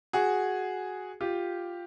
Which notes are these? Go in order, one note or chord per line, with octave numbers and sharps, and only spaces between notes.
F#4 G#4
F4 G4